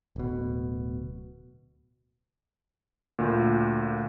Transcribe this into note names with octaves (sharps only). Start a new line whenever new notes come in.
D1 B2
D2 A#2